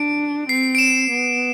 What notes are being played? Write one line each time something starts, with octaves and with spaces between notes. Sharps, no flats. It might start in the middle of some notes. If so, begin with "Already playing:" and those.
Already playing: D4 D7
C4 C7
D7
E7
B3